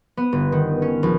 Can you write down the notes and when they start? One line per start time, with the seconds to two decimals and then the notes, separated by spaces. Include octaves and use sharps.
0.17 B3
0.32 G1
0.52 D#3
0.82 C#4
1.03 A#1